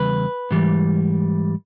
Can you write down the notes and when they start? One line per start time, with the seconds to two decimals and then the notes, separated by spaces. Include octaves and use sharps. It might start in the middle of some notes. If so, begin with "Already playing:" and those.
Already playing: E2 C#3 G3 B4
0.51 G#2 E3 G3